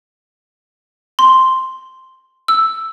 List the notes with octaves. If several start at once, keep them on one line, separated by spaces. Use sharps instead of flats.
C6
E6